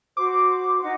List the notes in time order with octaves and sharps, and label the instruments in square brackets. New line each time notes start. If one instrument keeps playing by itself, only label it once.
[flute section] F#4 C5 [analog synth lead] D6
[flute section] D#4 F#5 D6